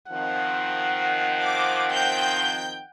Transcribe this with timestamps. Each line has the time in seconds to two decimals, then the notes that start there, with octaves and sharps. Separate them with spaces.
0.11 D#3 F3 C4 F#5
1.42 D6
1.93 G5 G6